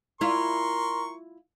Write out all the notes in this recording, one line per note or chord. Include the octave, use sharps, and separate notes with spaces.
E4 F4 A#4 C6 C#6